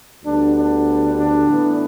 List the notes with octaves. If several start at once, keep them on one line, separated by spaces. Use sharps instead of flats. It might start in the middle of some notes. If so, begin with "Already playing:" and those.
D2 D3 G3 B3 D4
D4
D4
A2 E3 B3